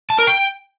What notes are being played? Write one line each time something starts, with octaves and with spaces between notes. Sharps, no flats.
A5
A#4
G5